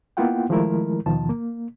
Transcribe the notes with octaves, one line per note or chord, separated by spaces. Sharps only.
A#3 B3 E4 F4 F#5 G5
D#3 F3 G#3 A3 E4 A#4
D#2 B2 D#3 F3 A5
A#3